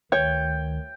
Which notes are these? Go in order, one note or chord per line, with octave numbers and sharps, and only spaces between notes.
D2 D#3 C#5 G5